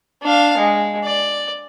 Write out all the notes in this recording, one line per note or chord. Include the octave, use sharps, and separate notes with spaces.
D4 F5
G#3
D5